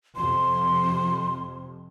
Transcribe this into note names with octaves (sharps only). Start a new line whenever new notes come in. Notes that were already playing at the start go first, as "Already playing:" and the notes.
F2 C3 C6